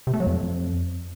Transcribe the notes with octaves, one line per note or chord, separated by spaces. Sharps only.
C3
A3
F#3
F2